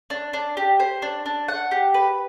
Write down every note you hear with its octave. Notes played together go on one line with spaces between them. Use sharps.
D4
D4
G4
C5
D4
D4
F#5
G4
B4